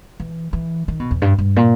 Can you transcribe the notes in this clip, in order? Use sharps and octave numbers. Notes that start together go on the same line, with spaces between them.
E3
E3
D#3
B2
E2
G2
G2
A#2